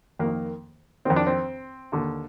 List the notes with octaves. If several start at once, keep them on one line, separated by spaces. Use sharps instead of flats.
F2 D#3 A#3
F2 D#3 C4
D4
C4
D#2 D3